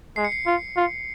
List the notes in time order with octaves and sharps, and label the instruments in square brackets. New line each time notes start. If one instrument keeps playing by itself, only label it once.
[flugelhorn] G#3 [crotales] C7
[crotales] C#7
C7
[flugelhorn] F4
F4